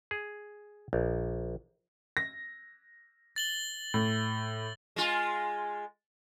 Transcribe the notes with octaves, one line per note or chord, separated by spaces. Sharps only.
G#4
A#1
A#6
A6 F#7 G7
A2
G#3 F4